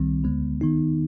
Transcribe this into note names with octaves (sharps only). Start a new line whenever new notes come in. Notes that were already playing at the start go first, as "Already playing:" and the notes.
Already playing: C2 D#3 G3 C4
D2 D3 G#3 B3
D#3 B3 D#4